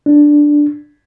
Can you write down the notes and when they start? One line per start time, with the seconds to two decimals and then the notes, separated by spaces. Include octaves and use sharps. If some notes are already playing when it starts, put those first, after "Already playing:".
0.06 D4